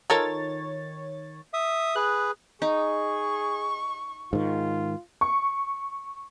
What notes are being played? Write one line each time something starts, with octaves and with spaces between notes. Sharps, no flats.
D#3 F4 A4 A#4 C#5 A6
E5 D#6
G#4 B4 F#6
D#4 G#4 C#6
G#2 D#3 F4
C#6